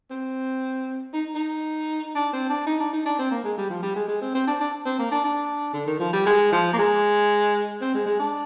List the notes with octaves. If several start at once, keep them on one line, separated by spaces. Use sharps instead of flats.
C4
D#4
D#4
D4
C4
D4
D#4
D4
D#4
D4
C4
A#3
G#3
G3
F3
G3
G#3
G#3
C4
C4
D4
D4
C4
A#3
D4
D4
D3
D#3
F3
G3
G#3
F3
A#3
G#3
C4
G#3
G#3
D4